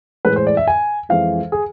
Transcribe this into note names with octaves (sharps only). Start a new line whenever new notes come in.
A2 E3 G#3 B4
C5
D5
E5
G#5
F2 E3 G#3 F5
G#4